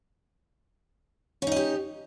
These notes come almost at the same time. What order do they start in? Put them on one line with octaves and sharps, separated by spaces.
C#4 D#4 D#5 G4